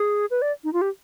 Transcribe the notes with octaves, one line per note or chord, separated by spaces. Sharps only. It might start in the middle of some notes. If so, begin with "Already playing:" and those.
Already playing: G#4
B4
D5
D#4
F4
G4